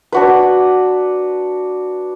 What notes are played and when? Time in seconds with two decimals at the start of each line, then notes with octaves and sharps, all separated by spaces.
0.12 D4 F#4 B4